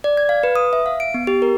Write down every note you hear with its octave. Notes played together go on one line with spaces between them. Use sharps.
D5
G#6
F5
B4
D#6
E5
F5
D7
B3
G4
A#4